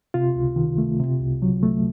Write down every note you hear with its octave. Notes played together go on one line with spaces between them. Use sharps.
C3 F4
C#2
D#3
A3
C3
C2
F#3
A3